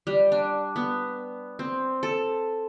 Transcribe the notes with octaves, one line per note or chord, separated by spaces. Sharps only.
G3
D4
B3
C4
A4